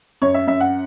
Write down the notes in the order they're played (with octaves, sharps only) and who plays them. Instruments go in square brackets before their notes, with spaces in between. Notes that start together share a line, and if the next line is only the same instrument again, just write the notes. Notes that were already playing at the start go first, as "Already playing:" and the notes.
[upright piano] F#2 C#5
E5
F#2 E5
F#5